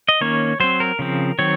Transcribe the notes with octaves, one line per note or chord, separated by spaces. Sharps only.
D#5
D#3 A#3 C#4 C#5
F#3 C4 C5
A#4
C#3 F3 C4
D#3 F#3 C4 C#5